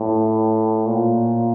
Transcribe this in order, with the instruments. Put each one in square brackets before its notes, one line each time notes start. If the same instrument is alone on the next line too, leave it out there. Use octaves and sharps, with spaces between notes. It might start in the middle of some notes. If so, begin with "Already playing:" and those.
Already playing: [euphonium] A2
A#2